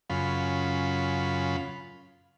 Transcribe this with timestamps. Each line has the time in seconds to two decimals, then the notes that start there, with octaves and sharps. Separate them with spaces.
0.10 F#2 C#3 F4 B5